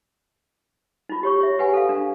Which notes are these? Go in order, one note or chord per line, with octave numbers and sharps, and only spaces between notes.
D#4 F4
G4 C#5 C#6
C#5 E5
G4 B4 F#5 G#5
A4 F5
D4